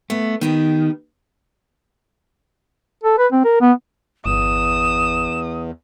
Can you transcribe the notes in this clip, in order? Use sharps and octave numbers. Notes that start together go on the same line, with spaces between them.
A3 B3
D#3 B3 D#4 G4
A4
B4
C4
A#4
B3
G1 E2 D#6 E7